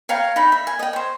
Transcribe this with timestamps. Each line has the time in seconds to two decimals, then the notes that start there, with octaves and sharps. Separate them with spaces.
0.09 C#5 F5 G5 A#5
0.36 D#4 B5
0.52 E5
0.67 G#5
0.79 D#5 G5
0.93 C5 C#5